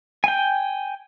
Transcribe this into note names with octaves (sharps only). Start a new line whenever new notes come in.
G5 G#5